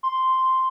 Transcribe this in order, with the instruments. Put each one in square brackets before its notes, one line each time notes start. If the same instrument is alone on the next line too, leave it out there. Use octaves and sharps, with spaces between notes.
[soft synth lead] C6